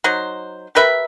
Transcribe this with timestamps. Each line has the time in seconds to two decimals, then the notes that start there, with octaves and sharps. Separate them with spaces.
0.04 F#3 D#4 C5
0.75 G4 A#4 B4 E5